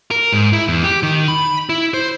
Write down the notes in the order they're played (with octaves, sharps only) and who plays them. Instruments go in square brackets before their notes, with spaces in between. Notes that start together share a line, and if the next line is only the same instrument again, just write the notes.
[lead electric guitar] A#4
G#2
E4
E2
G4
D#3
B5
E4
C5